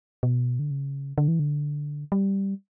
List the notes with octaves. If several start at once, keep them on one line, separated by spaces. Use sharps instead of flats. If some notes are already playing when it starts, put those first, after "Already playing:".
B2
D3
C#3
D3
E3
D3
G3